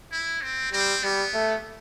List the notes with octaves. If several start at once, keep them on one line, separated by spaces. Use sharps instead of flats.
E4
C4
G3 C4
G3 B3
A3